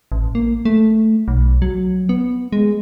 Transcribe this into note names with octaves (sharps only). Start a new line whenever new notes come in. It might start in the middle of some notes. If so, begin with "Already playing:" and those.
A1
A#3
A3
B1
F#3
B3
G#3